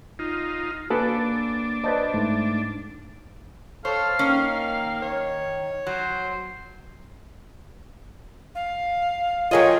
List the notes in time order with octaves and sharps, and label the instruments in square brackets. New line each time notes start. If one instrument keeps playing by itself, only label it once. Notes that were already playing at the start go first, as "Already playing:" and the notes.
[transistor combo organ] D#4 F4
[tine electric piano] A#3 [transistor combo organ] D4 [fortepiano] G#4 A4 B4
[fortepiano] B4 C5 A5 [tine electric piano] D5 D#5
[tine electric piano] G#2 A3
[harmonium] A4 [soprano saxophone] C5 [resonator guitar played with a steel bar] C#5 [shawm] F5
[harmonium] D#3 [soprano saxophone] A#3 [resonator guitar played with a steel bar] C#4
[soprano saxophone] C#5
[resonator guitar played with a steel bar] F#3 [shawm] C5
[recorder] F5
[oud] F#3 G#4 D#5 [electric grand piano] F4 A#4 G5 [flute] C#5